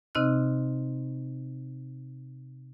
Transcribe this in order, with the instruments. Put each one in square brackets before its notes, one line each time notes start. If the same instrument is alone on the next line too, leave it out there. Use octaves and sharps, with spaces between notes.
[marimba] C3 C4 D#4 D#5 F6 F#6